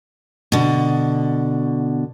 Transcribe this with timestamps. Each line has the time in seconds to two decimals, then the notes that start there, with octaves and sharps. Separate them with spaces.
0.52 B2 D3